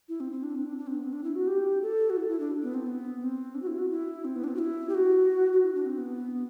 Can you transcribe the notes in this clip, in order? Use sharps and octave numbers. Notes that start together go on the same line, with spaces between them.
E4
C4
C4
D4
C4
D4
D4
C4
B3
C4
D4
E4
F#4
G4
A4
F#4
E4
E4
D4
B3
C4
B3
C4
D4
F#4
E4
F#4
E4
C4
B3
D4
C4
F#4
E4
G4
F#4
F#4
E4
D4
C4
B3